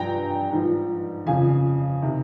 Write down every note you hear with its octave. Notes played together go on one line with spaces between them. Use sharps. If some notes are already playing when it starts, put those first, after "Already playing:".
Already playing: G2 F3 G5 G#5 A#5
G#2 F3
F2 C#3 F3 F5 G#5
C3 D#3